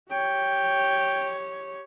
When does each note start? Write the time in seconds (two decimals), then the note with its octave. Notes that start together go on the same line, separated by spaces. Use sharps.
0.11 G4 C#5 G5